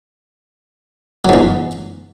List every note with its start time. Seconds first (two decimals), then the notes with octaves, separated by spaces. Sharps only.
1.25 F#3
1.29 G#2
1.34 E2